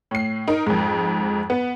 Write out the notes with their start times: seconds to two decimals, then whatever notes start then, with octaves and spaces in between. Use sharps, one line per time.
0.11 A2 C7
0.48 D#4 A#4
0.66 F2 G#2
1.50 B3